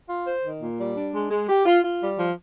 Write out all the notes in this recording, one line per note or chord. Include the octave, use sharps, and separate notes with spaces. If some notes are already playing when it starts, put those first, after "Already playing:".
F4
C5
D#3
A#2
G3
D4
G#3
G#3
G4
F4
F4
G3
F3